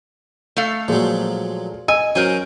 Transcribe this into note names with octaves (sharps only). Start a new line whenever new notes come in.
A3 A4 F5
A#2 F3 F#3 G#3
D#5 G#5 E6
F#3 C#4 A#4 C5 G#5